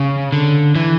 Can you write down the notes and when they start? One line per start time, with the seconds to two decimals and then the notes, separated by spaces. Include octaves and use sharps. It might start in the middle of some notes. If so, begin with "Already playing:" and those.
Already playing: C#3
0.32 D3
0.75 E3